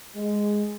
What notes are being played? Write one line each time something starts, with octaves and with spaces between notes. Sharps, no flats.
G#3